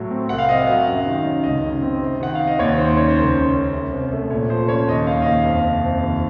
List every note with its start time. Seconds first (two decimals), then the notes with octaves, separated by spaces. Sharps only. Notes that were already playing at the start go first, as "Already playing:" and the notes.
Already playing: A2 F#3
0.10 C4
0.29 C2 F#5
0.38 F5
0.49 C3 D#5
0.58 F5
0.67 F#3
0.87 F#2
1.06 D#3
1.25 C#4
1.44 C#2 D#5
1.64 C#3
1.82 C4
2.02 C3
2.20 D#3 F#5
2.35 C3 F5
2.47 D#5
2.59 D#2 C#5
2.78 D#3 C5
2.97 C#4 C#5
3.09 C5
3.17 C#2 A#4
3.33 C#3 C5
3.54 C#4
3.73 C2
3.92 C3
4.12 A3
4.30 A#2 C#5
4.50 F3 C5
4.68 C#4 C#5
4.88 D#2 D#5
5.07 D#3 F5
5.22 D#5
5.26 D#2 F5
5.45 F2
5.64 C3
5.84 F2
6.03 D#2